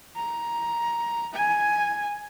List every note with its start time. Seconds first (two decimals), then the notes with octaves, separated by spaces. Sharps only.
0.16 A#5
1.34 G#5